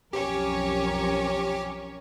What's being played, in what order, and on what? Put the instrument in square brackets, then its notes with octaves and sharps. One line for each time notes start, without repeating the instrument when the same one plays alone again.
[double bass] B1 F2 [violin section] C#4 A#4 C#5 [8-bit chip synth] G4